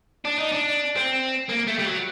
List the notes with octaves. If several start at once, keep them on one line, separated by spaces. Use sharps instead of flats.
D4
D#4
D4
C4
A#3
A3
G3
F#3